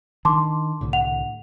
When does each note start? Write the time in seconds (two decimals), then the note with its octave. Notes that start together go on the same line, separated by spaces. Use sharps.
0.25 D#3 D4 A5 C6 D6
0.81 C2 A2 D3
0.93 F#5 F7